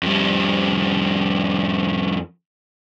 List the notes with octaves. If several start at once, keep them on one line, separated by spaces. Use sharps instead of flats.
F2 G3